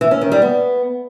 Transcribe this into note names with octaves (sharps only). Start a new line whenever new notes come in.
E3
C#4
D#3
G3
B3